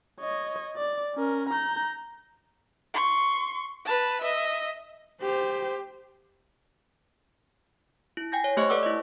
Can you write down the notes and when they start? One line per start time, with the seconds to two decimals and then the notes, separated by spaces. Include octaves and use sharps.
0.20 C#5 D#5
0.77 D5
1.16 C#4 A#4
1.49 A#5 G6
2.94 C6 C#6
3.85 B4 A5
4.21 D#5 E5
5.22 G4 C5
8.17 E4
8.32 G5 G#5 G6 A#6
8.44 C#5
8.57 A3 G4 C5 D#5 C#6 F#6
8.69 A4 B4 D5 F#5 D6 E6
8.83 E4 D#5